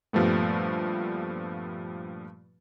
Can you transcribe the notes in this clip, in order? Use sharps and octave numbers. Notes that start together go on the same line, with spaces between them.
G2 A#2 F3 G3 A3 B3